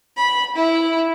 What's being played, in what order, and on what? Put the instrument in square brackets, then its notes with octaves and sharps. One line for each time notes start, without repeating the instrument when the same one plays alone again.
[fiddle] B5
E4